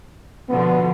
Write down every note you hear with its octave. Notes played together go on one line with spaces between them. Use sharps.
B2 D3 F3 B3